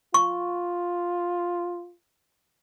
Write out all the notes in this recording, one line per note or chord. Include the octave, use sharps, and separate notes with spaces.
F4 C#6